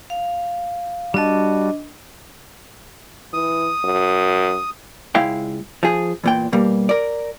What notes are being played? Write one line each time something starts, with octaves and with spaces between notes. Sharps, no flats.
F5
G3 D4 F#4 D#5 A5
E3 D#6
F#2
C#2 G#3 E4 F5 G5
F3 G#4
E2 A#2 G5
B2 G3 A#3
A#4 D5